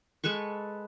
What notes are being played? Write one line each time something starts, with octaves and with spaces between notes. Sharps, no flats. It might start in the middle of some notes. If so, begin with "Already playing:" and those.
G#3 A4 B4 C#6